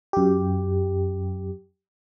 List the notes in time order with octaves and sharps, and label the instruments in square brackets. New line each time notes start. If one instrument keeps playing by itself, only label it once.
[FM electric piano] F#2 G4